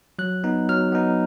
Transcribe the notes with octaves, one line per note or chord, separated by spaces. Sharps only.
F#3 F#6
B3 D#4
F#3 F6
B3 D#4